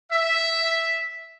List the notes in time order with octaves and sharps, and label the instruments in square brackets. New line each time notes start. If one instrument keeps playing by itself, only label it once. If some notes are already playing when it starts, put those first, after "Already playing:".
[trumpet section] E5